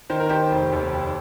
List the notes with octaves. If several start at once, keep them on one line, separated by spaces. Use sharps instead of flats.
D#3 C5
A#4
D#3 G4 C5
F1
D#2
F1